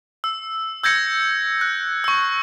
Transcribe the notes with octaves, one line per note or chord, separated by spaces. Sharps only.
E6
E6 G6 G#6 A#6 C#7
F#6
C#6 E6